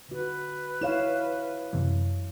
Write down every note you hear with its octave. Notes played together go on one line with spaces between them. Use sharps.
D3 F#4 B4
E4 C#5 F5 E7
F#2 C3 E3